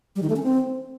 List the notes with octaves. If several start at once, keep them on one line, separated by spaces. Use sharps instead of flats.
G3
D#3
A3
C#4
C4